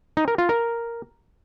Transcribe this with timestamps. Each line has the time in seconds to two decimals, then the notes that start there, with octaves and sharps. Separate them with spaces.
0.17 D#4
0.28 A#4
0.38 F4
0.49 A#4